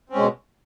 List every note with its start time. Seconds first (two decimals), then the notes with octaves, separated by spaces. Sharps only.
0.10 C4
0.12 C#4
0.15 G#3
0.18 B2